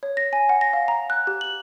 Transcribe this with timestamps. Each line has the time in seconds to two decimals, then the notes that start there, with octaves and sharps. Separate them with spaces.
0.03 C#5
0.17 A#6
0.33 G#5
0.49 F#5
0.61 A#6
0.73 F5
0.88 A#5
1.10 F#6
1.27 G4
1.41 F#7